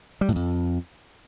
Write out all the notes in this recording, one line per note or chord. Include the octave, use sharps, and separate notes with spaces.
G3
A2
F2